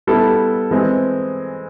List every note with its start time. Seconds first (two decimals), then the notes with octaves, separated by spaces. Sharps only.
0.07 G3 B3 E4 A4
0.71 E3 G#3 C4